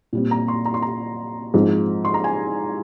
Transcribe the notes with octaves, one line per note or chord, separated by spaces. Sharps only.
A#2 G3 C4
A#5
C6
A#5
C6
A#5
G#2 F3 C4
C6
A#5
G#5